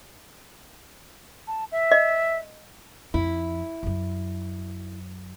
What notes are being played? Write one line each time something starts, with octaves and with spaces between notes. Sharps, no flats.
A5
E5
D#5
F2 E4
F#2 F#3